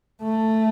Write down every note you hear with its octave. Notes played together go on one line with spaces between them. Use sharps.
A3